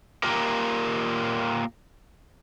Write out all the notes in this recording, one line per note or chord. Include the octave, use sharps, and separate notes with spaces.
A#3 F4 G4 A#4